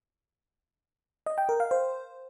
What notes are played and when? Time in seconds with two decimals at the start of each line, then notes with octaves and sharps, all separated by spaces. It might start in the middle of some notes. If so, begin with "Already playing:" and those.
1.26 D#5
1.38 G5
1.49 A#4
1.60 F5
1.71 C5